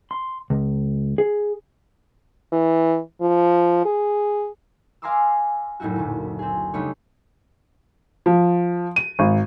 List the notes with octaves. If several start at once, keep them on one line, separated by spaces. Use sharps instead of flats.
C6
C#2
G#4
E3
F3
G#4
F5 G#5 A#5 C6 D6 E6
F#1 A2 D#4 E4 F#4
D2 A#2
C4 G#4
C#3 G3 A3 D4 D#4 C#5
F3
D#7
G#1